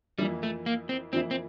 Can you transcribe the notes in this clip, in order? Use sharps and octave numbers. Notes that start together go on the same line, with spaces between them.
F2 E3 G3 A#3 E4
A3
A#3
C4
F2 E3 A#3 C4 E4
C4